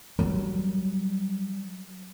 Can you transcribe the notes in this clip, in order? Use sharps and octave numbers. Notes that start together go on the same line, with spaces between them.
F#3 G3